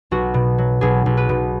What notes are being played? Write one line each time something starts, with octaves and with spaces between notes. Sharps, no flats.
B1 F#4
B2
F#3
B1 G#4
B1
B4
B2